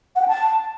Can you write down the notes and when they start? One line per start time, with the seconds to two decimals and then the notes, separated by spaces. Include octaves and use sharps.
0.16 F#5
0.22 G5
0.28 A5